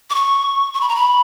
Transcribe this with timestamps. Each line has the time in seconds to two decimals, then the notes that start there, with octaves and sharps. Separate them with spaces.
0.10 D6
0.15 C#6
0.74 C#6
0.81 B5
0.89 A#5
0.95 B5